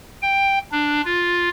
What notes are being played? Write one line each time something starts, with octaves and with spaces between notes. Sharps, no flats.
G5
D4
F4